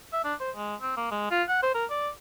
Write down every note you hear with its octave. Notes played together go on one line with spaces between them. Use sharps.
E5
D4
C5
G#3
C4
A#3
G#3
F4
F#5
C5
A#4
D5